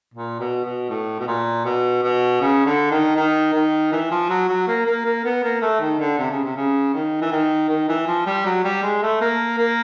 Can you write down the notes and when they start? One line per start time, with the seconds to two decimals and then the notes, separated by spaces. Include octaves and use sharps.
0.14 A#2
0.40 B2
0.64 B2
0.89 A2
1.19 B2
1.27 A#2
1.65 B2
2.03 B2
2.41 C#3
2.66 D3
2.91 D#3
3.16 D#3
3.54 D#3
3.92 E3
4.11 F3
4.30 F#3
4.49 F#3
4.68 A#3
4.86 A#3
5.05 A#3
5.25 B3
5.43 A#3
5.62 A3
5.80 D#3
6.00 D3
6.19 C3
6.31 C#3
6.44 C3
6.56 C#3
6.94 D#3
7.21 E3
7.32 D#3
7.69 D#3
7.89 E3
8.07 F3
8.26 G3
8.45 F#3
8.64 G3
8.83 G#3
9.02 A3
9.21 A#3
9.58 A#3